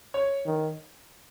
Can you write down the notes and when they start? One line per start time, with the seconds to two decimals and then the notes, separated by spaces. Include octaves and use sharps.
0.14 C#5
0.46 D#3